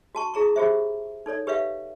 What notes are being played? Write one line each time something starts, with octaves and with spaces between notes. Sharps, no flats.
F#4 A5 C#6
E4 G#4 A#5 C#6
F4 G4 G#4 C5 E5
D#4 A4 C#5 D5
G4 B4 C#5 E5 F5